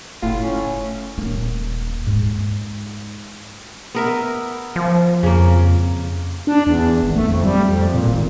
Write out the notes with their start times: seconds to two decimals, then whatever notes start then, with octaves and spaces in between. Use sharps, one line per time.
0.23 F#1 A2 F4
0.42 C#4
1.18 D#1 A#3
2.07 G#2
3.95 B3 A#4 E5
4.76 F3
5.23 F2 C#3 A#3
6.47 D4
6.67 E2
7.03 G#1
7.16 A3
7.29 F2
7.44 G3
7.69 F2
7.94 A#2
8.08 G#1